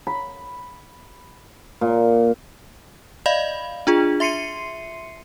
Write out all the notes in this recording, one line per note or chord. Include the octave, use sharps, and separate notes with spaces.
B5
A#2
D5 D#5 F5 B5
D4 F4 G#4
E5 C6 C7 C#7 D#7